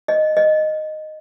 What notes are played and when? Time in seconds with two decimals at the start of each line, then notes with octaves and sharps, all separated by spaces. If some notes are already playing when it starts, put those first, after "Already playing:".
0.08 D#5
0.37 D#5